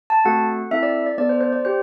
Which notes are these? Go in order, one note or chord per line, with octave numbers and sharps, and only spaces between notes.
A5
A3 C4 F#4 A4 F#5
C4 E4 A4 E5
D5
D5
B3 D4 A4 D5
C5
C5
D5
D4 G4 C5